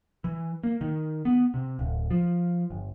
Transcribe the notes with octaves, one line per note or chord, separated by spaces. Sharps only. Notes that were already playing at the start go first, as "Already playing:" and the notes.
E3
A#3
D#3
B3
C3
D1
F3
G1